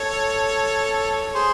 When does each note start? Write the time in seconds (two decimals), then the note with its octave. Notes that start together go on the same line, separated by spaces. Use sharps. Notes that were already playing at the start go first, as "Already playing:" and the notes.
Already playing: A4 C#5
1.35 G#4 C5